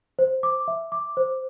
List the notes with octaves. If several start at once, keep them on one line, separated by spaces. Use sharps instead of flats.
C5
D6
E5
D6
C5